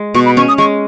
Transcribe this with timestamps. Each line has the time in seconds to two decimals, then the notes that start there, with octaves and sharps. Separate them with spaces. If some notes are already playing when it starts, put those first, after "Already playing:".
Already playing: G#3
0.14 B2 C#6
0.26 B5
0.37 C#4 C#6
0.48 D#6
0.58 G#3 C#6